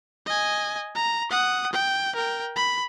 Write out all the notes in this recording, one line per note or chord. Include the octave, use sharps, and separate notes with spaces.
D#5 G#5
A#5
F#5 D#6
G5
A#4 G5
B5